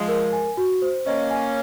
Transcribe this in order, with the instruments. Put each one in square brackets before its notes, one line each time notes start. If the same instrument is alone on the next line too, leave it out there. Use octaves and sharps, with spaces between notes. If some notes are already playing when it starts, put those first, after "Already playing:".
Already playing: [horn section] F3 G#3
[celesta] A#4
G#5
F#4
C5
[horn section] A#3 C#4 [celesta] D#5
[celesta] G#5